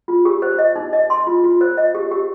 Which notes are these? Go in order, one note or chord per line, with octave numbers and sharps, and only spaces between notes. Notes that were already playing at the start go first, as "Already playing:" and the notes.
F4
G4
C5
D#5
D#4
D#5
C6
F4
F4
C5
D#5
G4
G4